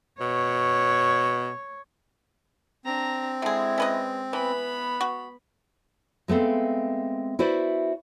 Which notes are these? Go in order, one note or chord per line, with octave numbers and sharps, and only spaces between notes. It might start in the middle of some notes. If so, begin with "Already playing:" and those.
B2 C#5
C4 D4 A#5
D3 G#3 E4 G#4
C#4 B4 D#5
E3 B3 B4 B5
F#4
G#3 A3 B3 C4 F5
E4 F#4 B4 C5 D5